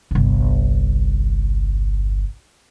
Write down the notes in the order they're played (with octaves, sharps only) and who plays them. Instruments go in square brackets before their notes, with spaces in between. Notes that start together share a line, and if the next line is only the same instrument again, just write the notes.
[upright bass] G1 C2